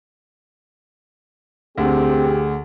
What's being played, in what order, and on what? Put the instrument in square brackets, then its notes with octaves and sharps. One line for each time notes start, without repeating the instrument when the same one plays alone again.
[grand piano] D2 [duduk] C4 [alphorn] G4 [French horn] G#4